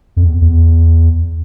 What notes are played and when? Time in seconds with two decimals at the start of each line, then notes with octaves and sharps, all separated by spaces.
0.17 F2
0.25 E2
0.42 E2